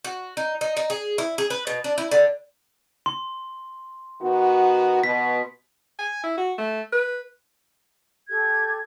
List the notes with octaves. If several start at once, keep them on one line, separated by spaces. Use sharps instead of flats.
F#4
D#4
D#4
D#4
G#4
E4
G#4
B4
B2
D4
E4
D3
C6
D#3 B3 F#4
B2 B6
G#5
E4
F#4
A3
B4
G4 A4 G#6